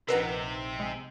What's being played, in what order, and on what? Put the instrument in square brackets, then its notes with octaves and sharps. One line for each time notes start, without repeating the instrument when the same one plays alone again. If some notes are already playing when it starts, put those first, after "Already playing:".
[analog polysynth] A#1 D#4 E6 [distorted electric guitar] C3 [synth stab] A#4 B4 F#5
[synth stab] G#3